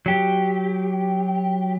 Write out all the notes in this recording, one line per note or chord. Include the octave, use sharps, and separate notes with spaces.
F#3 G4